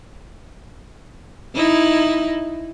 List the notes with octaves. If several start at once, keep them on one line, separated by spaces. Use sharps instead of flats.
D#4 E4